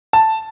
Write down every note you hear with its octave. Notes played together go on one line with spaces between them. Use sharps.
A5